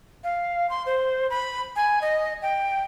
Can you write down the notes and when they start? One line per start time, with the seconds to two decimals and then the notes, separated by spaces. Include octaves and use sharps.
0.24 F5
0.70 C6
0.86 C5
1.30 B5
1.76 G#5
2.02 D#5
2.42 G5